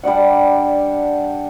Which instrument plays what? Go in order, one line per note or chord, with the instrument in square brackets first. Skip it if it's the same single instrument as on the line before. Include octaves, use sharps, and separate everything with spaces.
[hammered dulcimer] G3 D4 D5 F#5